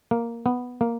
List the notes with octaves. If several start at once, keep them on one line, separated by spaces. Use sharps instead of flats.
A#3
B3
A#3